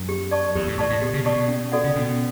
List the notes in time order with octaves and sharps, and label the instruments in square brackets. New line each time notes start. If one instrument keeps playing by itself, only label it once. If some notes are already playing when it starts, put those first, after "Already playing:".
Already playing: [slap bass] F#2
[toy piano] G4
D5 A5 C#6
[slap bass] E2 [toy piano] G4
[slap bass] A2
[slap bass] A2 [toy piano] D5 A5 C#6
[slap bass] A2
[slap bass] B2 [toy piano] G4
[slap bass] C#3
[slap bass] B2 [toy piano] D5 A5 C#6
[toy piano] C#4
F#4 A4 D5 F#5
[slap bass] C#3
[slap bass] B2 [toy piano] C#4